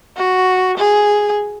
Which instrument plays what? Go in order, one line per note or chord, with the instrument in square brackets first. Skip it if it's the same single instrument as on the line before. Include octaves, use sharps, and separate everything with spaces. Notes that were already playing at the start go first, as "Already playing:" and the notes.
[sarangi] F#4
G#4